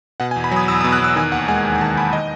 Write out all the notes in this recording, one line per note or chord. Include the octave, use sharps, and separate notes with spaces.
B2 F#5
G#5
E2
B5
F#3 D#6
E2 E6
D#6
B2
F#6
E2 E6
D#3 G#5
D#2 F#5
G#3 G#5
D#2
G#5
D#3 A5
D#2 B5
D#3 D#5